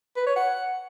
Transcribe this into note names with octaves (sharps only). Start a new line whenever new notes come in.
B4
C#5
F#5